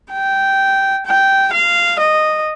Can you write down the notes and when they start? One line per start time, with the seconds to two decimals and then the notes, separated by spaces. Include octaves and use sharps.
0.12 G5
1.06 G5
1.53 F5
2.00 D#5